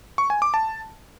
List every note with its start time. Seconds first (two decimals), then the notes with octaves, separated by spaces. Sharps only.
0.18 C#6
0.30 G#5
0.42 D6
0.54 A5